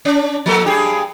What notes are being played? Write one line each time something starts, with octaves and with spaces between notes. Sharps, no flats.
C#4 D4
F3 A#3 A4
G2 G4 G#4